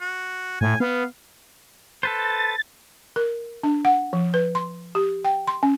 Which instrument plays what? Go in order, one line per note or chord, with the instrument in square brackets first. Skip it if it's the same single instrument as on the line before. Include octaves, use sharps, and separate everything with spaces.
[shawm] F#4
[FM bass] A2 [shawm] G#5
[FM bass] B3 [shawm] F5
[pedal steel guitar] A4 B4 C5 [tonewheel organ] A6
[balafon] A#4
D4
F#5
F3
B4
C6
G4
G5
C6
C#4